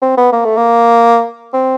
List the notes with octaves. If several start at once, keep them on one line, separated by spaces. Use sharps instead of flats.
C4
B3
A#3
A3
A#3
C4